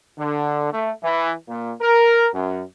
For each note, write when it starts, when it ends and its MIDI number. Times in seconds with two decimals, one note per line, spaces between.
0.18 0.71 50
0.73 0.91 57
1.04 1.33 52
1.49 1.72 46
1.82 2.29 70
2.34 2.62 42